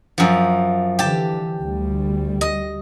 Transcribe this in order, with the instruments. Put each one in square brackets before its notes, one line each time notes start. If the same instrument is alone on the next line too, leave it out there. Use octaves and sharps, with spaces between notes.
[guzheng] F#2 F3
[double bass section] D3 E3 [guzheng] G4 A5
[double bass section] D2 G3
[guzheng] D#5